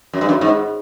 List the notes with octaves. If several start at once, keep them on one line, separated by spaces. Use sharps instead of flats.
F#2
G2
F#2
G#2